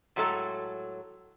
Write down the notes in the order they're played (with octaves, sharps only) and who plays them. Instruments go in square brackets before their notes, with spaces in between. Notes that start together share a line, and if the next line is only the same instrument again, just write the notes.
[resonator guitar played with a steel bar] A2 F#3 G#3 A4 A#5